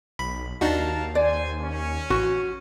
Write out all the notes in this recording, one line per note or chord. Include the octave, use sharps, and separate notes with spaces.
B1 B5
D#2 D4 D#4 F#4 A#4 F5 A5
C5 D5 G#5
C#4
A1 F#4